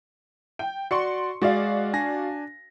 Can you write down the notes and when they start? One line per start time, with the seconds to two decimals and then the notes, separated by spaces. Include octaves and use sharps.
0.59 G5
0.91 F#4 D5 C6 C#6 C#7
1.41 G#3 F#4 D5 F5 A6
1.93 D4 G#5 A#6